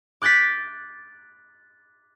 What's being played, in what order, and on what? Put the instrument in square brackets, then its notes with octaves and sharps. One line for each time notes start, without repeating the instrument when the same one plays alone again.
[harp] D6 F#6 G6 A6 B6